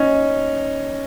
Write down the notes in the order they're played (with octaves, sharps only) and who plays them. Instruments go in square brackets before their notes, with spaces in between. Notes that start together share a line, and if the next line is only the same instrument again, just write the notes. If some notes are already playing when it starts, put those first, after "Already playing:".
Already playing: [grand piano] C#4 D#4